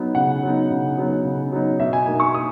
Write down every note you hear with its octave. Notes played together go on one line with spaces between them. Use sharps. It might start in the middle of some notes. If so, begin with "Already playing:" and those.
Already playing: F#3 B3 D#4
C#3 F#5
F#3 B3 D#4
C#3
F#3 B3 D#4
C#3
F#3 B3 D#4
B2 E5
G#5
A#3 D#4 G#5
C#6
B2 D#6